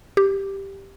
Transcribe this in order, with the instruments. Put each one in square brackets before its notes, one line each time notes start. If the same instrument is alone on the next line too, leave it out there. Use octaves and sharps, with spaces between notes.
[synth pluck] G4